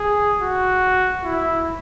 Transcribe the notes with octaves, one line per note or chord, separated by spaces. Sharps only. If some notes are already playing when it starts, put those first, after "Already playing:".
Already playing: G#4
F#4
E4